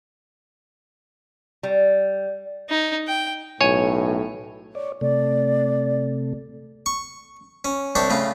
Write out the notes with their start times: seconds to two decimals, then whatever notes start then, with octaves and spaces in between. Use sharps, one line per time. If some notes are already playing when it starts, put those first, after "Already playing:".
1.63 G3
2.69 D#4
3.08 G5
3.61 B1 A2 C#5 G#5
4.75 C#5 D5
5.01 C3 A3 D5
6.86 C#6
7.65 C#4
7.95 C2 D4 G4 C#5
8.10 A2 C#3 F4